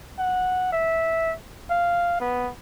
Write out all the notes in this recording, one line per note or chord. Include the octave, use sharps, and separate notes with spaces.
F#5
E5
F5
B3